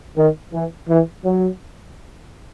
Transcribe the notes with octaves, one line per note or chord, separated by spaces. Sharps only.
D#3
E3
E3
F#3